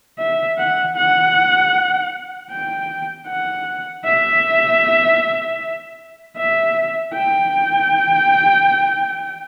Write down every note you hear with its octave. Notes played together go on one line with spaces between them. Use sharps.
E5
F#5
F#5
G5
F#5
E5
E5
G5